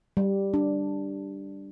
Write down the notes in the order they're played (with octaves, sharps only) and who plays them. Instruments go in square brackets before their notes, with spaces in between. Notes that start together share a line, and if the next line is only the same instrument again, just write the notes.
[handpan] G3
D4